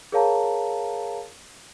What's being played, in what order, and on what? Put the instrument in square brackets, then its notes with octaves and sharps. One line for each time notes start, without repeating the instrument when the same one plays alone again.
[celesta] G#4 A#4 C#5 F5 A5 A#5